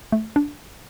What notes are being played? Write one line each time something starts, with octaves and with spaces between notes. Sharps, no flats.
A3
D4